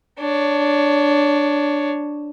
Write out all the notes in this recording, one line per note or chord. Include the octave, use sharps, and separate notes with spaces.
D4 C#5